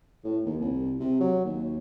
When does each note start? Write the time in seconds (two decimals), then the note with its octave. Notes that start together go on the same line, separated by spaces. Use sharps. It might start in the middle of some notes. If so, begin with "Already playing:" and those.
0.24 A2
0.45 D#2
0.61 C2
1.00 C3
1.21 F#3
1.45 D#2